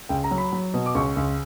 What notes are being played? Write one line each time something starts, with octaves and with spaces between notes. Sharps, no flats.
C#2 G5
A#5
F#3
B5
F#3
B2
D6
C#2 C#6
C#2